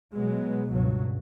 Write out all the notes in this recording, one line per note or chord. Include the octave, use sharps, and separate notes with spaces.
B2 F#3 G#3 B3
G1 C#2 G2 B2 F#3